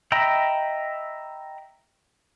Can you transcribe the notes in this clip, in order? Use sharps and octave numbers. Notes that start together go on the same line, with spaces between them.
D#5 E5 G5 A#5 B5